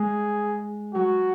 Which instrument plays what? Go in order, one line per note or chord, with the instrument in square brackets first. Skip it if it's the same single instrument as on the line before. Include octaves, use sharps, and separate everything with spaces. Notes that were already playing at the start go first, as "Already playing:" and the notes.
Already playing: [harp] G#3 [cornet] G#4
[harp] F#3 [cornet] F#4